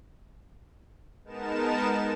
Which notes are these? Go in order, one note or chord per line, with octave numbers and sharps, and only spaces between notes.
G#3 B3 D#4 A#4 A5 E7